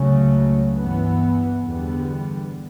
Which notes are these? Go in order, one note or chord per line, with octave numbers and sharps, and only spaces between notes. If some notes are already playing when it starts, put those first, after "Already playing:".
Already playing: C#2 C#3 F#3 A3 C#4
G2 E3 B3
E2 D3 G3 B3